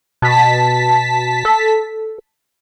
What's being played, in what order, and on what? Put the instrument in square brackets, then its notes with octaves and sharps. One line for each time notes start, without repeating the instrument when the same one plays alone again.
[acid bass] B2 [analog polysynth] A5 B6
[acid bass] A4